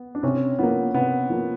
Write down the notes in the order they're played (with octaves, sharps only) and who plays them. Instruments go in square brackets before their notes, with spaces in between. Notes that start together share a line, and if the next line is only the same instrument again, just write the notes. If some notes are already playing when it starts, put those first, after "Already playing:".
Already playing: [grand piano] B3
D4
[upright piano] C3 [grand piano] C#4
[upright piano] F3 A#3 [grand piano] B3
[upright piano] C3 [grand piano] B3
[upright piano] F3 A#3